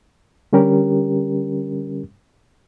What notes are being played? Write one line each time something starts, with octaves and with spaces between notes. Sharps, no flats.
D3 G3 C#4 G4 A#4